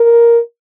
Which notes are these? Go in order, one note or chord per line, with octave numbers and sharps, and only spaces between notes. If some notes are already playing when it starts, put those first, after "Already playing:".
Already playing: A#4